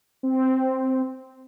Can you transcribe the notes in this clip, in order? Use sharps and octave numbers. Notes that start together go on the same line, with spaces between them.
C4